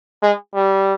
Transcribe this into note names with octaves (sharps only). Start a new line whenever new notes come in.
G#3
G3